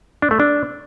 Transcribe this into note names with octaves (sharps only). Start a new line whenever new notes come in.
D4
A3
D4